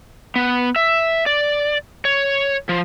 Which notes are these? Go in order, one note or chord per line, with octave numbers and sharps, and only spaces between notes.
B3
E5
D5
C#5
F3